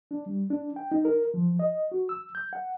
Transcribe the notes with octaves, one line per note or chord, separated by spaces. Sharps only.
D4
G3
D4
G5
D#4
A#4
F3
D#5
F#4
E6
G6
F#5